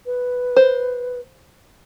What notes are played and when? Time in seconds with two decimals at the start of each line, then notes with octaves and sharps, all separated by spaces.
0.06 B4
0.56 C5